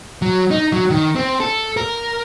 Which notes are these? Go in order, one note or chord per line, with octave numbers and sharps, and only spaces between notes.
F#3
D#4
F#3
D#3
C4
A4
A#4